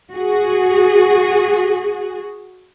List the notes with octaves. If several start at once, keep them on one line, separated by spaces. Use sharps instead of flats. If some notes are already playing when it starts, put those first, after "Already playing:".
F#4 G#4